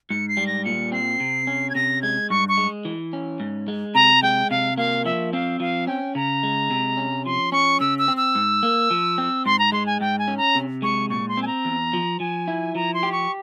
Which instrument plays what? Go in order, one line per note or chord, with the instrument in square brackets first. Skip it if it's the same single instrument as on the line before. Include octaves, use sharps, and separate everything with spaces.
[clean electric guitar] G#2 [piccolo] C#7
[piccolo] C7
[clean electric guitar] G3
[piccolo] A#6
[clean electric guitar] A#2 [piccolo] C#7
[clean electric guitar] C4 [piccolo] C7
[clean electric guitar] C3
C#4
[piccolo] G#6
[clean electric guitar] C3 [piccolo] A#6
[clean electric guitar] G#3 [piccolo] G#6
[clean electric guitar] G2 [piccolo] C#6
[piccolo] C#6
[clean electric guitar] G#3
E3
C#4
G#2
G#3
[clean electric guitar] C3 [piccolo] A#5
[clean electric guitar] G#3 [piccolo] G5
[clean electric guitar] C3 [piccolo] F5
[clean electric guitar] A#3 [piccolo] F5
[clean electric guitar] F3 [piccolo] E5
[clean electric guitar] C4 [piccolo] F5
[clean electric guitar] F3 [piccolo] F5
[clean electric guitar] C#4 [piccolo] G5
[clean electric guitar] C#3 [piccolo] A#5
[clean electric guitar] G#3
C3
C#4
[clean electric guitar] F3 [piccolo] C6
[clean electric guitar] C#4 [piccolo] C#6
[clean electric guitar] C#3 [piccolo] E6
[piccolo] E6
[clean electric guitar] C4
[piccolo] E6
[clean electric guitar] G#2
A#3
F3
C4
[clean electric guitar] G#2 [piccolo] C6
[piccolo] A#5
[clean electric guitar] G#3 [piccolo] C6
[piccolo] G#5
[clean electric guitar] G#2 [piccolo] G5
[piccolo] G#5
[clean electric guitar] C#4
[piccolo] A#5
[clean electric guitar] C3
[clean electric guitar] G#3 [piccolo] C#6
[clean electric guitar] A#2 [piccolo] C#6
[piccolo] C6
[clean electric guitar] C4 [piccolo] G#5
[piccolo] A#5
[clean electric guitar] E2
F3
[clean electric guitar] F3 [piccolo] G#5
[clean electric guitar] E4
[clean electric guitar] F3 [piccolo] A#5
[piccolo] C6
[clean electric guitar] G4
[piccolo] C#6